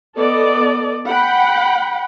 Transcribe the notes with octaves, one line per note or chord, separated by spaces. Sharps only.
B3 A4 D5 D#5
F#5 G5 B5